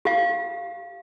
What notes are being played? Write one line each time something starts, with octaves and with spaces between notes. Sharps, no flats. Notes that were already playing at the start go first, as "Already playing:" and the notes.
G4 F5